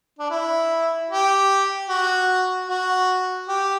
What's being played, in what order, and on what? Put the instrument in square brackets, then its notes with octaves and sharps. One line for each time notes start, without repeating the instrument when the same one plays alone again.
[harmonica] D4
E4
G4
F#4
F#4
G4